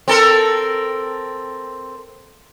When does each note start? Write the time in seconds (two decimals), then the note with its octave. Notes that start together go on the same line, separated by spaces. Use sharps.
0.08 C4 A4 A#4